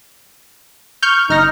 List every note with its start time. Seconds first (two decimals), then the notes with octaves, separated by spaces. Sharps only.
1.03 C#6 F6 G6
1.29 G1 D#4 F6 A#6